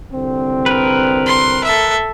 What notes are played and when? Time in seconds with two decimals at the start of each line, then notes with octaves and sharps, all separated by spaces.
0.12 C2 D3 C4
0.66 A#4 B4
1.26 C6
1.64 A4 E5